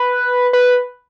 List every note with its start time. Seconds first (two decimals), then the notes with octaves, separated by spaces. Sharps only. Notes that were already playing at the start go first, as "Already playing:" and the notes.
Already playing: B4
0.53 B4